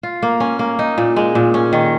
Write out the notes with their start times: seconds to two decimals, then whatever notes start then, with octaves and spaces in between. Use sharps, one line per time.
0.03 F4
0.23 A#3
0.40 C#4
0.59 A#3
0.79 D#4
0.98 A#2
1.16 G#3
1.35 A#2
1.54 C#4
1.73 D#3